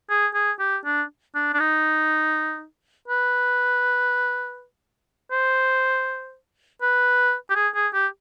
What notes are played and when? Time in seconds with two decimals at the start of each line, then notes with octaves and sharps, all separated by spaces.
0.10 G#4
0.34 G#4
0.59 G4
0.85 D4
1.35 D4
1.54 D4
1.60 D#4
3.08 B4
5.32 C5
6.82 B4
7.50 G4
7.55 G#4
7.75 G#4
7.94 G4